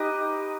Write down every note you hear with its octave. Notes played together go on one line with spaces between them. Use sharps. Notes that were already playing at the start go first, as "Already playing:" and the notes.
Already playing: D#4 G4 B4 D#5